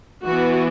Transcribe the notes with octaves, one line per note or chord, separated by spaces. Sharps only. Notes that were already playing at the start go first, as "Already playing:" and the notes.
E3 B3 F#4